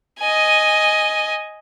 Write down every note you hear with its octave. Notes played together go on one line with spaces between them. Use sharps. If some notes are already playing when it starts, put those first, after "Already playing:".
D#5 G#5